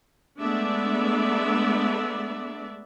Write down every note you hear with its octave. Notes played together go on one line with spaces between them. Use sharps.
G#3 A3 B3 D4 D5 E5